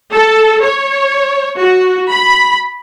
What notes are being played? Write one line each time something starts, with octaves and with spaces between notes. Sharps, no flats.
A4
C#5
F#4
B5